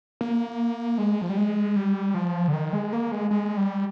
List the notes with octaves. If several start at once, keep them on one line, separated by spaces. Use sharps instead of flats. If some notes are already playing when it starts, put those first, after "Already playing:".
A#3
G#3
F3
G3
G#3
G3
F3
D3
D#3
G#3
A#3
G#3
G#3
G3